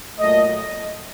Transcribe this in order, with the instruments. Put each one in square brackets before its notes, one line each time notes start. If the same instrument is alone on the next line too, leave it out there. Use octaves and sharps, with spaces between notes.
[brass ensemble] A#2 F#3 A3 D#5